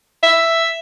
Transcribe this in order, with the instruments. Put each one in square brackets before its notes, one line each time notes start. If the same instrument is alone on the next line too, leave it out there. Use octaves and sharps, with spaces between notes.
[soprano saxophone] E5